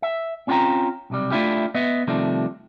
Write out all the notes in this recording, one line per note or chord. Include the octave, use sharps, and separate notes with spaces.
E5
C4 C#4 F4 D5 G5 A#5
B1 C3 G3
A3 A#3 D4 E4 F4 G4
B3 B4 D#5 E5
C3 D#3 F3 G3 A3